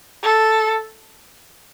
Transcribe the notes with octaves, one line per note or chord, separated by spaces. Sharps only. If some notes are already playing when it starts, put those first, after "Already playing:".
A4